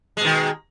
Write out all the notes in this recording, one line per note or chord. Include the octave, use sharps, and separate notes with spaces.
B2 D#3 G#3